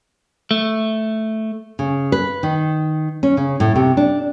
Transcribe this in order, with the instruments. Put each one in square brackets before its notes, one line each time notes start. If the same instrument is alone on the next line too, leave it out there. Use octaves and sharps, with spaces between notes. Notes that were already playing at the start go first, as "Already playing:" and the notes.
[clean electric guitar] A3
[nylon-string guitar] C#3
B4
D#3
C#4
C#3
A2
C3
D4